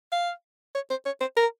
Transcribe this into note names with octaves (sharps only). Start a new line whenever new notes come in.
F5
C#5
C5
C#5
C5
A#4